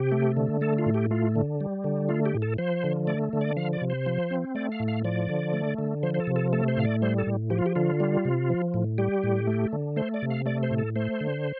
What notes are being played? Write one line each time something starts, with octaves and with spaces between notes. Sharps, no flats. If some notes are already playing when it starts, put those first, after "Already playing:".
Already playing: C3 G4
A3
D3
A3 A4
F4
A2
G4
A3 F4
D3
G3
D3
A3 F4
G4
A2
A4
F3 C5
D3
A3 D5
D3
D5
F3 F5
D5
C3
C5
F3
C4
A3 D5
F5
A2
F5
F3 D5
D3
A3
D3
F3 C5
C5
A4
C3
A4
A3 A4
C5
A2 F5
D5
G3 C5
A4
A2
F3 G4
F4
G4
D3 F4
G3
C3
F3
A2
G3 G4
A2
A3
D3
A3 C5
D5
C3
F5
A3 D5
C5
A2
A4
A3 C5
D3